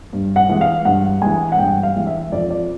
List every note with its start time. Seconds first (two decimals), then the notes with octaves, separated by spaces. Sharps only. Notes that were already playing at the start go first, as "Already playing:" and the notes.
0.13 G2
0.36 F#5
0.49 E3 G#3
0.61 F5
0.85 G2 F#5
1.22 E3 G#3 G#5
1.52 F#5
1.58 G2 G5
1.83 F5
1.95 E3 G#3
2.07 E5
2.32 F2 D5
2.50 D5